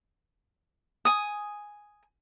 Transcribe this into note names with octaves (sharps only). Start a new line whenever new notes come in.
G#5 D#6